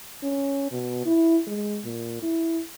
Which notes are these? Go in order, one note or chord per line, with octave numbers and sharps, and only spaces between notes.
C#4
B2
E4
G#3
A#2
E4